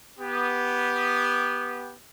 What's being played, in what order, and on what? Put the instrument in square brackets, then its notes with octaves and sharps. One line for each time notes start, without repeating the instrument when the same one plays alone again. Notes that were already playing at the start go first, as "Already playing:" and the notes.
[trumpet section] B3 G4